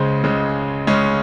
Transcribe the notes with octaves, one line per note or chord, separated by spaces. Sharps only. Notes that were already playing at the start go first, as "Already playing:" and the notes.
Already playing: C#2 C#3 G#3 G#4 C5
C#2 C#3 G#3
C#2 C#3 G#3 C#4